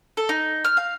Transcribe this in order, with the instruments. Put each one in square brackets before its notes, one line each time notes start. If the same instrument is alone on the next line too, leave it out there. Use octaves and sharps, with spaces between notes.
[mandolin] A4
D#4
F6
F5